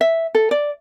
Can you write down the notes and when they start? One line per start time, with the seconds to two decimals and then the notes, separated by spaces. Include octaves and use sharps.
0.01 E5
0.35 A4
0.51 D5